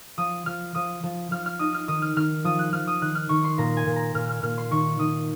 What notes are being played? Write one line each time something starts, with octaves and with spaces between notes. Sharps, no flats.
F3 D#6
F3 F6
F3 D#6
F3
F3 F6
F6
D#4 D#6
F6
D#3 D#6
F6
D#3 F6
F3 D#6
F#6
F3 F6
D#6
D#3 F#6
F6
D#3 C#6
C6
A#2 A#5
G#5
A#2
A#5
A#2 F6
F6
A#2 F6
C6
D#3 C#6
D#3 D#6